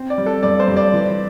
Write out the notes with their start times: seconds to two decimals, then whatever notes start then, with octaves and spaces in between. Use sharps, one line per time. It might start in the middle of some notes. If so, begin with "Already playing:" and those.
Already playing: C4
0.10 D5
0.18 G3
0.26 A4
0.43 G2 D5
0.60 C5
0.68 G2
0.77 D5
0.93 E3